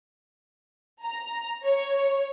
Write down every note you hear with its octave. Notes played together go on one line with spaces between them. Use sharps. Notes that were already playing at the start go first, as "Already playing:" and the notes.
A#5
C#5